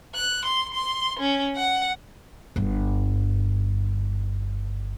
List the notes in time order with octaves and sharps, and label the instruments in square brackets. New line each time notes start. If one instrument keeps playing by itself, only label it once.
[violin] F#6
C6
C6
C#4
F#5
[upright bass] G1 G2